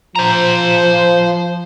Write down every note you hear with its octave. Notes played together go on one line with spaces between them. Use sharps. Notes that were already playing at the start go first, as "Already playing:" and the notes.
F3 C5 A#5